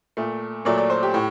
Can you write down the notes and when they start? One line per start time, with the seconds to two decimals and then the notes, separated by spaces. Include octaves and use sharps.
0.17 A#2 A3
0.65 A#2 F#3 A3 D5
0.77 D5
0.90 C5
1.03 G4
1.14 A2